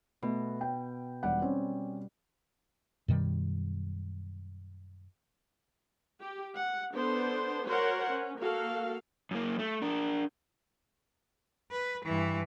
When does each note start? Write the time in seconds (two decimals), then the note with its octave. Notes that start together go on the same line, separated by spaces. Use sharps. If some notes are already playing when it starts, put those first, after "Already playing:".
0.22 B2 A3
0.61 G5
1.23 E1 G3 F#5
1.42 C4 C#4
3.08 F#2 B2 D#3 G3
6.20 G4
6.56 F#5
6.94 B3 D4 A4 C5
7.67 F#4 A#4 C5 C#5 F#5
8.11 C#4
8.40 A#3 F#4 A4 F5
9.31 F#2 A#3
9.59 A3
9.82 D4 A#4
11.71 B4
12.05 G2 E3